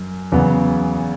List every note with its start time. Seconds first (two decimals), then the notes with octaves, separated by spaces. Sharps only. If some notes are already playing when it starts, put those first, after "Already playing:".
Already playing: F#2
0.32 E2 C#3 F#3 B3